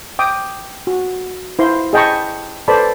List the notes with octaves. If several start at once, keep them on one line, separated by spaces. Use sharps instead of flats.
G5 D6 D#6
F#4
E4 C5 F5 C6
G#4 D#5 G5 A5 B5 C#6
A4 B4 C5 D5 A5 B5